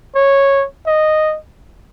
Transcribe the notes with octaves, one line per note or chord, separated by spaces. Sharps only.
C#5
D#5